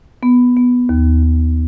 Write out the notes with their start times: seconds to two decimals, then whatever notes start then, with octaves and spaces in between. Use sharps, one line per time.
0.23 B3
0.57 B3
0.89 D#2
1.23 D#2